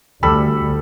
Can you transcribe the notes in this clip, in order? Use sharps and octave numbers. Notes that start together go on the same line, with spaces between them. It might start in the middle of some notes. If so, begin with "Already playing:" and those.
D2 G3 A4 B5